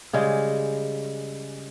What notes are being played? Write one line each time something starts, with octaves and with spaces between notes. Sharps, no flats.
C#3 G3 G#3